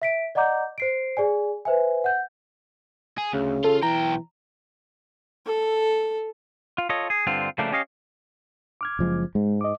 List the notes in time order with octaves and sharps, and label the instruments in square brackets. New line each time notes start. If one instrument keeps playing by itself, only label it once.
[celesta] E5 B6 D7
D5 D#5 F#5 A#5 D6 G6
C5 C7 D7
G#4 D5 G#5
B4 C5 E5 G#5
F#5 G6
[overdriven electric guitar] G#4
[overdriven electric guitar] D2 [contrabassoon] C#3
[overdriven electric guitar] F4 [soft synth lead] A4
[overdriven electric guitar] B1 G5 [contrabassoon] E3 [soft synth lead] A#5
[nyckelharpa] A4
[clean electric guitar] F4
F4 A4 C#5 D#5
G#4
G2 D3 C4 F4
C#3 F3 G3 A3 A#3 D4
C#4 G4 C#5 D#5 F5
[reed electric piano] D6 F6 G#6
[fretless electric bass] F#1 F3 G#3
[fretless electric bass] G#2 [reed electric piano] G#3
[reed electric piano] D#5 D6